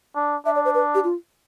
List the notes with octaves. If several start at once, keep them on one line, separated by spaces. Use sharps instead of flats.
D4
D4 E5
D5
C5
B4
G4
F4